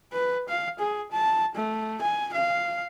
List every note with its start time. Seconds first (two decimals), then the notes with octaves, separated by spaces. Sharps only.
0.13 B4
0.49 F5
0.79 G#4
1.12 A5
1.55 A3
2.02 G#5
2.33 F5